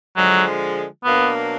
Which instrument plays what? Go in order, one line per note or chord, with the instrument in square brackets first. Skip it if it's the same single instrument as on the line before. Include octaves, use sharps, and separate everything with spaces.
[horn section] D3 F3 G#3 [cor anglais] F#3
[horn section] B2 F#3 A#3 D4 [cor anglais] B3